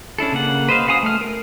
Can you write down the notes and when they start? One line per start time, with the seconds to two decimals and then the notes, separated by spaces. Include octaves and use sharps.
0.18 C#4 D4 E4 A4
0.32 C#3 A#3 F#5
0.69 B4 C5 D#5 F5
0.88 F#4 F5 G#5 A#5 D#6
1.03 A3 F6
1.21 A#4